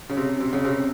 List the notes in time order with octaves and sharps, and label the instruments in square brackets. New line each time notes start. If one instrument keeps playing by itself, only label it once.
[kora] C#3
C3
C3
C#3
C3